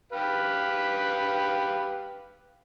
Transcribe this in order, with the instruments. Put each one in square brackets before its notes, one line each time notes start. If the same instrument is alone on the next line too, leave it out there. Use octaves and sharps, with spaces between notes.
[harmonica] G4 B4 F5